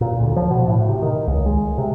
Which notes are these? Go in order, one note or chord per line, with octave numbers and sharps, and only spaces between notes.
A#2
D2
F3
B2
A2
C3
D#3
C#2
G#3
C3